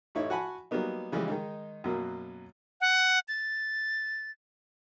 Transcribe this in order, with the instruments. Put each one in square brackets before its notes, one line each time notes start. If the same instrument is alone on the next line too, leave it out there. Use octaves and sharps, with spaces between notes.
[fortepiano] A1 A3 D#4 E4 C#5
F#4 F#5 G#5 A5 B5
F#3 G3 A#3 B3 D#4
C#3 E3 F3 G3 G#3
D#3 G#3 D#4
F#2 B2 F#3 A#3
[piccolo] F#5
A6